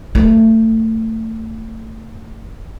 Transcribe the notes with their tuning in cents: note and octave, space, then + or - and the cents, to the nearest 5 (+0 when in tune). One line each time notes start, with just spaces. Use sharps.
A3 +25